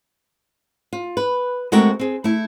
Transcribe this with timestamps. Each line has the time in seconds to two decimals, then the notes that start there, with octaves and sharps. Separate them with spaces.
0.93 F4
1.17 B4
1.72 G#3 A3 C4 F#4 A4 A#4
2.00 C4 G#4
2.24 A3 E4